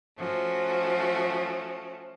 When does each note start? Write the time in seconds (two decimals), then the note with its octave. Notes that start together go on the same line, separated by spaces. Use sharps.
0.17 F3 A3 C#4 F#4